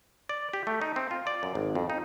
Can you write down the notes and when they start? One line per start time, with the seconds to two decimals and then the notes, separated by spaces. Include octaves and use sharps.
0.29 D5
0.53 G4
0.67 A3
0.81 D#4
0.96 C4
1.11 F4
1.27 D5
1.43 F#2
1.55 G#1
1.75 F2
1.90 D#4